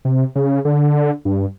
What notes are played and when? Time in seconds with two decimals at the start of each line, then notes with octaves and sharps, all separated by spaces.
0.05 C3
0.36 C#3
0.65 D3
1.25 G2